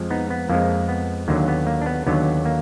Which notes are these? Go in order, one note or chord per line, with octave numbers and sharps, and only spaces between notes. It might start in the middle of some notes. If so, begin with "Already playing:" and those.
Already playing: F2 F3 G#3
B3 D#4
B3
F2 F3 G#3 A#3
B3
D#2 D3 F#3 A#3
B3
A#3
D4
B3
D#2 D3 F#3 B3
A#3